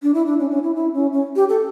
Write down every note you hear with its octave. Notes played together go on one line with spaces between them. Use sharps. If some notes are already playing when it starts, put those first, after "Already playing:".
D4
E4
D4
C#4
C#4
E4
E4
C#4
C#4
G4
A4